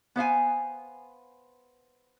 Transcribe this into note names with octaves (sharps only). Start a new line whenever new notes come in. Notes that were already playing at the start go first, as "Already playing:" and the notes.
B3 C5 F5 G#5